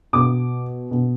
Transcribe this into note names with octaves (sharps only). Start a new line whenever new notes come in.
B2 D6
B2